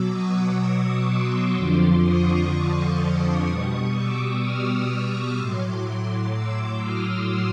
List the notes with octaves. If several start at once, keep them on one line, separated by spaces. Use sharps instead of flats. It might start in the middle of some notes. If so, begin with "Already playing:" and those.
Already playing: B2 F#3 D6 E6
C#6 D#6
C6 D6
F2 D3 F3 C6 D6
C#6 D#6
C6 D6
C6 D6
B2 G3 C#6 D#6
D6 E6
D#6 F6
C#6 D#6
A2 F#3 C6 D6
D6 E6
D#6 F6